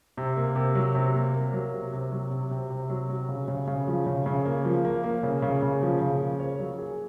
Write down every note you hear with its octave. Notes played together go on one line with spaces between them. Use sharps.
C3
A#3
C3
F#3
C3
A#3
A#3
F#3
C3
C3
F#3
C3
C3
C3
F#3
F#3
C#3
C#3
C#3
F3
C#3
C#3
A#3
F3
A#3
A#3
C#3
C#3
C#3
F3
C#3
A#3
C#5
F#3
G#4